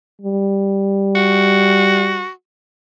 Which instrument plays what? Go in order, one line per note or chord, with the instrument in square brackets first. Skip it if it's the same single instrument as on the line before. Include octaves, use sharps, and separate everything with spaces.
[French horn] G3
[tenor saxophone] F#4